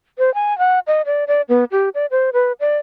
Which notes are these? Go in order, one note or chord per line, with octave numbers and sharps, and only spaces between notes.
C5
G#5
F#5
D#5
D5
D5
B3
G4
D5
C5
B4
D5